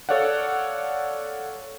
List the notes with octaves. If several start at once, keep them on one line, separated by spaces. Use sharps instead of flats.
A4 C#5 D5 F5 F#5